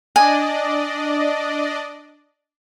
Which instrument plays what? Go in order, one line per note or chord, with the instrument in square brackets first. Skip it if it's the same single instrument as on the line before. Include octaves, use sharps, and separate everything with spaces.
[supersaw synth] D4 D5 D#5 [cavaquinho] G#5